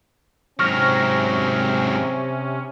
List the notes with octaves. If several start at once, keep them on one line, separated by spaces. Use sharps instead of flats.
G#2 C3 F#3 C4 C#4 C#6 F6 A#6